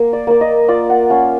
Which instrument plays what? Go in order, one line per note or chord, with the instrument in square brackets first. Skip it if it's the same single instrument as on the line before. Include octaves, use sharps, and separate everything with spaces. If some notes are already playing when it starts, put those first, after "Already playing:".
Already playing: [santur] A#3
D5
A#3 D5
D#5
F4 D5
F#5
C#4 F5